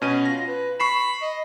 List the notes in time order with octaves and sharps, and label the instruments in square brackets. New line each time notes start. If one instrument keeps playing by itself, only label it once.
[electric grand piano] B2 C#4 D#7 [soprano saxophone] C#5
[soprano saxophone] F4 [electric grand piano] A#6
[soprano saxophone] B4
[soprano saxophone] B5 [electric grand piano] C#6 C7 E7
[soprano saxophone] D#5